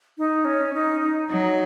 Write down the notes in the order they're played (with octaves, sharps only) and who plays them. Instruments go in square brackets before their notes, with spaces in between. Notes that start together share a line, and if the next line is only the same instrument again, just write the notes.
[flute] D#4
C#4
D#4
D#4
[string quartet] F#3 [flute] D#4